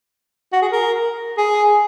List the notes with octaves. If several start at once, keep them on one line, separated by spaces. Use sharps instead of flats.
F#4
G#4
A#4
G#4